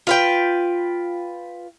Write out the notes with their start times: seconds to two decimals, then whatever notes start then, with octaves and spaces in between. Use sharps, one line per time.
0.07 F4 B4 G5